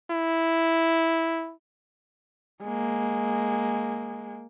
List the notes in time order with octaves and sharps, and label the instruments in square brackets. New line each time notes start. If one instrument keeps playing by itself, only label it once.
[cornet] E4
[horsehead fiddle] G#3 A#3